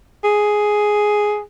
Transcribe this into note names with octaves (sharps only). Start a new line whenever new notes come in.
G#4